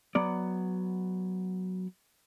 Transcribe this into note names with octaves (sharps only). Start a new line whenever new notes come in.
F#3 B3 D5